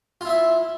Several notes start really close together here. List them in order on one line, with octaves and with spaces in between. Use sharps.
F4 E4 E5